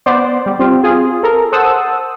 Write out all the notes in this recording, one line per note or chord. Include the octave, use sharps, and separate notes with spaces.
B3 C5 D5
G3
C4 F4 G4
F4 G#4
A4 A#4
C5 F#5 A5 D#6 E6